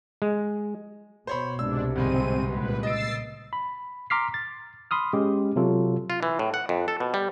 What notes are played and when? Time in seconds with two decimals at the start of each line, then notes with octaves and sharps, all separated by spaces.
0.22 G#3
1.27 B2 C5 C#5 B5
1.59 C2 G#2 C3 D4 E6
1.96 D2 G#2 G3 G#3 C4 D#7
2.49 C#2 A#2 B4
2.83 D#5 E6 A6 C7 D7
3.53 B5
4.10 A#5 C6 D6 F6 B6 C7
4.34 A6
4.91 B5 C6 D#6 F6
5.13 G#3 C#4 G4
5.56 C3 F#3 F4 A4
6.10 F4
6.23 E3
6.39 A2
6.54 F#5
6.69 F2
6.88 A4
7.00 B2
7.14 G3